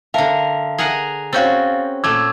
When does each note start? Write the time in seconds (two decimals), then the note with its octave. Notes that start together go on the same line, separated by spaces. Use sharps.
0.14 D3 A#4 E5 F5 A5
0.78 G#4 A#4 F#5
1.33 C4 C#4 F#4 F5 G6 A6
2.04 A#2 A3 D6 E6 G#6